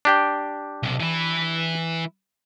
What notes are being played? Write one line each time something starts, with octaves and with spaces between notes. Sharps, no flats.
D4 G4 G5
B1 C3
E3 E4